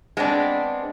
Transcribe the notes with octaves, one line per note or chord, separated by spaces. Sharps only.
G#3 B3 C4 D4